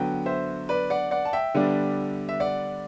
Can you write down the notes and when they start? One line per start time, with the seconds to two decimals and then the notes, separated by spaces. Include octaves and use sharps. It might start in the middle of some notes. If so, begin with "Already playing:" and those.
Already playing: D3 F#3 B3 G5
0.26 C5 E5
0.69 B4 D5
0.90 D5 F#5
1.11 D5 F#5
1.25 A5
1.33 E5 G5
1.54 D3 G3 B3 D4
2.29 E5
2.40 D5 F#5